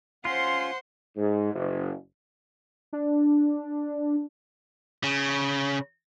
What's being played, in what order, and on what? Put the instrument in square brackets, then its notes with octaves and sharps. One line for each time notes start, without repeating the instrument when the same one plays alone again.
[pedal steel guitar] C#4 F4 [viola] C5 F#5 [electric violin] C6
[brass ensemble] G#2
F#1
[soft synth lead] D4
[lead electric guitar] C#3